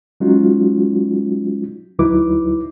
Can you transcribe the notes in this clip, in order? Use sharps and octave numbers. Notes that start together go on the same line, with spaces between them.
F#3 G#3 C#4 D#4 F4 F#4
D2 F#3 D#4 E4 B4 D6